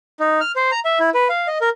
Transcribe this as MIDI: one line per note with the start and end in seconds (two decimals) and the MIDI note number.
0.20 0.40 63
0.41 0.52 89
0.56 0.71 72
0.72 0.80 82
0.85 0.99 76
1.00 1.10 64
1.14 1.28 71
1.29 1.47 77
1.47 1.58 75
1.61 1.69 70